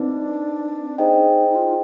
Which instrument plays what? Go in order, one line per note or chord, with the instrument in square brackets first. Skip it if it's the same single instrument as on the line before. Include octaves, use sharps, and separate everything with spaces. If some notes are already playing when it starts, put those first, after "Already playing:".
Already playing: [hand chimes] C4 D#4 B4 [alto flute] D4
[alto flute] D#4 [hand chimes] G#4 C5 D#5 G5
[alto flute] D#4
F4
F4